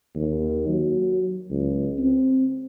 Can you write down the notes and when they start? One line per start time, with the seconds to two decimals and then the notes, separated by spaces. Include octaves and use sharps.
0.15 D#2
0.68 F#3
1.50 C#2
1.98 C4